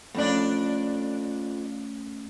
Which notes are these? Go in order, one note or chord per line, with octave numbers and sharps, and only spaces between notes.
F2 A3 C#4 D4